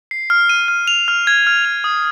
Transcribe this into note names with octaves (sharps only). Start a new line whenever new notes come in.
C7
F6
D#7
F6
F7
F6
G#6
F6
F7
D#6